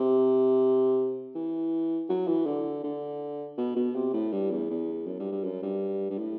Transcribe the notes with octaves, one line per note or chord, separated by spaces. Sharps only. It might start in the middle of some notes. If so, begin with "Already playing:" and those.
Already playing: C3
E3
F#3
E3
D3
D3
B2
B2
C3
A2
G2
E2
E2
F#2
G2
G2
F#2
G2
G2
A2